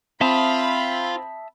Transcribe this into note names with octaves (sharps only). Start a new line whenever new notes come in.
C4 F4 E5 A5 B5 D#6